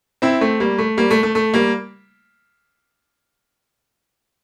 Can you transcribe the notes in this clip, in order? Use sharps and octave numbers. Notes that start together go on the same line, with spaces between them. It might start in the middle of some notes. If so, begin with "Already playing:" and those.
C4 E4
A3 C4
G3 A#3
A3
G3 A#3
A3
A3
A3
G3 A#3